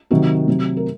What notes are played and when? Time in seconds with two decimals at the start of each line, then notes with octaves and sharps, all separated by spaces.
0.11 C3 D#3 F#3 F#4
0.48 C3 F#3
0.77 A#4